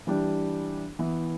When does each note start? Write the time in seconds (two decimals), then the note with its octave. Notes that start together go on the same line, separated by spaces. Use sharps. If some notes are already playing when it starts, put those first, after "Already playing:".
0.07 E3 G3 D4 G4
0.99 E3 B3 E4